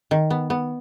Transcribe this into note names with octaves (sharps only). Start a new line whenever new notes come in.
D#3
B3
B3